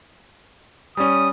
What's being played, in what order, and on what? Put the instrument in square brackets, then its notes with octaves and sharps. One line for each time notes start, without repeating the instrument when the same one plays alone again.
[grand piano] G3 C#4 [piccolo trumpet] D#6